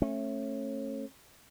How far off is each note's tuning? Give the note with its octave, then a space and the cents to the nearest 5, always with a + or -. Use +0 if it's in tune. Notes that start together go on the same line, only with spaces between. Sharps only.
A3 +5 C#4 -30